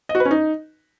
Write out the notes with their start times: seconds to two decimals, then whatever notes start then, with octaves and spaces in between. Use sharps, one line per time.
0.09 D#5
0.15 F#4
0.20 B4
0.25 C#4
0.31 D#4